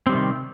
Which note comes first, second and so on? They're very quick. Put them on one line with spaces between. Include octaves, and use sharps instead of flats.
C4 G3 D#3 C3